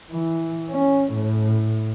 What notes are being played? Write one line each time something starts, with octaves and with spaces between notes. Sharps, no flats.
E3
C#4
A2